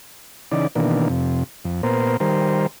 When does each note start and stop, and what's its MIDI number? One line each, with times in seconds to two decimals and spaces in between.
0.52 0.67 49
0.52 0.67 52
0.52 0.67 63
0.52 0.67 74
0.75 1.08 47
0.75 1.08 51
0.75 1.08 52
0.75 1.08 58
0.75 1.08 62
1.10 1.43 41
1.10 1.43 48
1.65 1.82 41
1.83 2.17 46
1.83 2.17 59
1.83 2.17 70
1.83 2.17 72
2.20 2.67 51
2.20 2.67 55
2.20 2.67 70
2.20 2.67 72